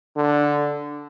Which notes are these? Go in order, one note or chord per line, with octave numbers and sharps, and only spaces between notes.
D3